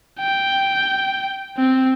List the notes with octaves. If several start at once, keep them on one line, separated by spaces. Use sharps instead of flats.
G5
C4